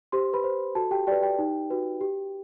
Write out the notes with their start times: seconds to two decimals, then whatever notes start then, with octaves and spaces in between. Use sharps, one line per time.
0.12 G4 C5 C6
0.33 B4 B5
0.44 C5
0.75 F#4 A4 A5
0.91 G4 G5
1.07 G4 B4 D5 G5
1.22 G4 G5
1.39 D#4
1.70 F#4 B4
2.01 G4